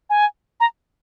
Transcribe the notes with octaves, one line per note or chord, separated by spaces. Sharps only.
G#5
A#5